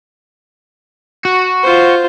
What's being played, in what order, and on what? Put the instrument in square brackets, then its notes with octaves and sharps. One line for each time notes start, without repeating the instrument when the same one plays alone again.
[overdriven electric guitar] F#4
[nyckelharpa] F4 C5